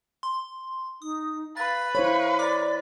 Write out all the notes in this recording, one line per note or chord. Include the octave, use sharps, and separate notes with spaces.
C6
D#4 D#6
B4 F5 A6
E4 C5 C#5 F5 B5
D5 D6